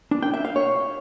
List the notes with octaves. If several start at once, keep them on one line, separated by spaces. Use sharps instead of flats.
D4
G5
E5
F5
C#5